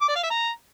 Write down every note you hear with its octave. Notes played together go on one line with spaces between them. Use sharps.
D6
D5
F5
E5
A#5